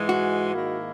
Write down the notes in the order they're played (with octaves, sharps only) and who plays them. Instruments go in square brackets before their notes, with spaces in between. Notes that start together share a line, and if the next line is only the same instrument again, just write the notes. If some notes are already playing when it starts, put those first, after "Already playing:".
Already playing: [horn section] G#2 E3 G#3
[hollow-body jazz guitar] F#4
[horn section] G#2 D#3 A#3 E4